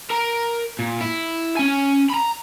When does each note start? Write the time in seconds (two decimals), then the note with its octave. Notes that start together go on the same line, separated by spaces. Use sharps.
0.10 A#4 A#5
0.79 A#2
1.01 E4
1.57 C#4 G#5
2.10 A#5 B5